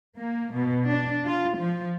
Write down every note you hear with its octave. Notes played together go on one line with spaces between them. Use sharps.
A#3
B2
D4
F4
F3